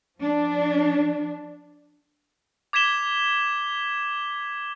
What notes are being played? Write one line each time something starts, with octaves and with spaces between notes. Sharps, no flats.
F3 D4
D6 G#6 B6 E7 G7